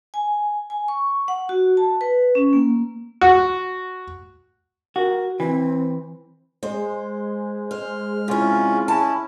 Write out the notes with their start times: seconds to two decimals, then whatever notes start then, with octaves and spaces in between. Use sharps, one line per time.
0.14 G#5
0.70 G#5
0.88 C#6
1.28 F#5
1.49 F#4
1.77 A5
2.01 B4
2.35 C#4
2.53 A#3
3.21 F#4
4.96 F#4 A#4
5.40 E3 C4
6.63 G#3 C5
7.71 C5 F6
8.28 C3 C#4 E4 F4
8.88 C#4 E4 A5